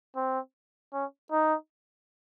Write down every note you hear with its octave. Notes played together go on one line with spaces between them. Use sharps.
C4
C#4
D#4